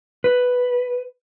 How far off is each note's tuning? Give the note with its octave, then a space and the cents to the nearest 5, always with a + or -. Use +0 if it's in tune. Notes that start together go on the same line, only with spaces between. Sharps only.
B4 +0